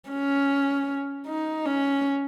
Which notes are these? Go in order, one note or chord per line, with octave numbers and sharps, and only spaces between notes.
C#4
D#4
C#4